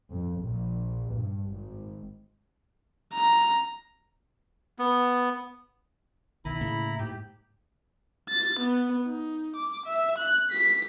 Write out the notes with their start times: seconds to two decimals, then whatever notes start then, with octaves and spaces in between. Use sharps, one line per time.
0.12 F2
0.43 A#1
1.14 G2
1.52 G#1
3.13 A#5
4.79 B3
6.45 B1 D#3 E4 A#5 B5
6.61 A2 C#3 A#3
6.99 G#2 G4
8.30 A6
8.59 B3
9.05 D#4
9.56 D6
9.86 E5
10.18 F#6
10.51 B6